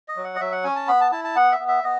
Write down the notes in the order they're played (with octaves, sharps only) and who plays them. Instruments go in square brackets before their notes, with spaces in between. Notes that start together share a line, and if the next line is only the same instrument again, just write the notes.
[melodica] D#5
F#3
F#5
D#5
F#3 E5
F#5
C#4 G#5
A5
B3 B5
A5
E4 A5
A5
B3 F#5
E5
B3
E5
B3 D#5